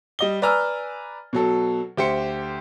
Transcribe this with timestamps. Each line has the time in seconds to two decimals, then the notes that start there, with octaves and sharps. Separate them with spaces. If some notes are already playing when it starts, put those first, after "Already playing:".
0.19 G3 D#5 G7
0.42 B4 D5 G#5 A#5 E6 F6
1.33 B2 F#3 A4
1.97 D2 G4 C5 C#7